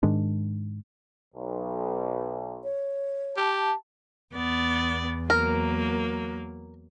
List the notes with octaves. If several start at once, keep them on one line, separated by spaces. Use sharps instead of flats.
G#2 D#3 G#3 D4
B1
C#5
G4 A5
E2 B3 D5
F#3 A#3 A#4